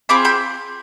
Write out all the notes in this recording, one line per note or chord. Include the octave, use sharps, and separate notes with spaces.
C4 F4 G#4 B5 D6
G5 B5